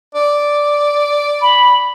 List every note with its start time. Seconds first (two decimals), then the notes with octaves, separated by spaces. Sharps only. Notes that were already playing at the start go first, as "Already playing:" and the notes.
0.15 D5
1.42 B5